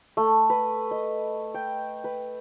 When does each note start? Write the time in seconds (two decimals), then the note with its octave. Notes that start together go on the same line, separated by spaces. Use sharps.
0.17 A3
0.50 B4
0.91 D#5
1.54 G5
2.04 B4